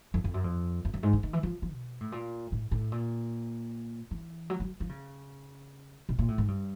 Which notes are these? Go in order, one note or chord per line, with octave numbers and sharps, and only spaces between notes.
F2
F2
F#2
F2
F2
F#2
G#2
D3
D#3
E3
F3
F3
B2
A2
A#2
A2
A2
A#2
E3
F#3
F#3
F3
C#3
B2
A#2
A2
G#2
G2